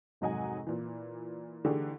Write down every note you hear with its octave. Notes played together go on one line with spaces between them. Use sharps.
F1 G#2 F#3 D#5 F#5 G#5
A#2 E3
D3 E3 A3 D#4 G4 G#4